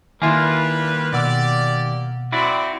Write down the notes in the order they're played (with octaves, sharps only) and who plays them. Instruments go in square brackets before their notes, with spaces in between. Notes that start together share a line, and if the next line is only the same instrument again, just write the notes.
[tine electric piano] D#3 [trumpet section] G3 B4 [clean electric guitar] A#3 F4 [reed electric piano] E4 E5 G#5
[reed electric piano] B2 F#5 E6 [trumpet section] G4 D5
[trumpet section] C4 [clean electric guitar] E4 F#4 D5